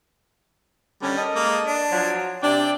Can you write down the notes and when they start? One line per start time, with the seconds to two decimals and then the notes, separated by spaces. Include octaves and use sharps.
1.02 D3 D#3 G3 C#4
1.17 A4 A#4 D#5
1.35 G#3 A#3
1.64 D4
1.91 F3 F#3
2.43 C3 D4 D5 G5